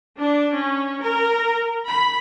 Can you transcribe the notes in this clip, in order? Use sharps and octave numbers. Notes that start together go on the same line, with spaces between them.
D4
C#4
A#4
B5